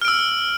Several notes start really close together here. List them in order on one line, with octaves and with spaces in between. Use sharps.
F6 D7 E6